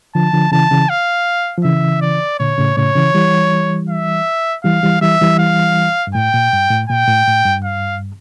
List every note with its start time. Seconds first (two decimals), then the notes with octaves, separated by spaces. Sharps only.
0.15 D3 F3 A5
0.33 D3 F3
0.52 C#3 E3 A5
0.71 C#3 E3
0.90 F5
1.58 F3
1.64 C#3 E3 E5
2.02 D5
2.39 A#2 D3 C#5
2.58 A2 C#3
2.77 A2 C#3 C#5
2.95 C#3 E3
3.15 E3 G3
3.90 E5
4.64 E3 G3 F5
4.83 E3 G3
5.02 E3 G3 E5
5.21 E3 G3
5.39 F5
6.07 G2
6.15 A2 G5
6.34 A#2
6.53 G2
6.70 A2
6.89 A#2 G5
7.08 A2
7.27 A2
7.45 G2
7.64 F5